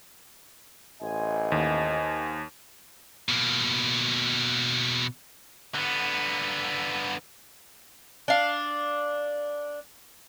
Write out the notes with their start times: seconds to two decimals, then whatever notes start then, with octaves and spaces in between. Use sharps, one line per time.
1.02 A1 C5 D#5 G#5
1.52 D#2
3.29 B2 A#3
5.74 D3 B3
8.28 D4 F5